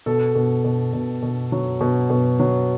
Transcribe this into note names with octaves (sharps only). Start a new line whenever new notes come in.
B2 A4
B2
B2
B2
B2
F#3
B2
B2
F#3